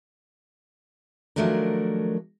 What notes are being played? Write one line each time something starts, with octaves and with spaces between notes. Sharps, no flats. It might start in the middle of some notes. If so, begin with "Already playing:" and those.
D#3 F3 F#3 A3 D4 A#4